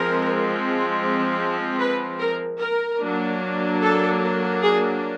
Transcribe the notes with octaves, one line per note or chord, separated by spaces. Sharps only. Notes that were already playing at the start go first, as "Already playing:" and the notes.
Already playing: F3 G#3 C4 A#4
B4
A#4
A#4
F#3 A#3 D4
A4
G#4